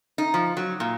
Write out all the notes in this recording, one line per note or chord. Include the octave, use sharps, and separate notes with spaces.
D#4
F3
F#3
A#2